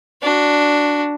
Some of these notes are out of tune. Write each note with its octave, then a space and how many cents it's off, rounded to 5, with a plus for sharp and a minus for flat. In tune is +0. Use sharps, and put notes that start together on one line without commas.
D4 +0 F#4 +5